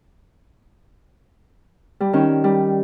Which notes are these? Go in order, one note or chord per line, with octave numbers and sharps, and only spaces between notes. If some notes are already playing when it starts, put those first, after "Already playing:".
G3
D#3 C#4
G3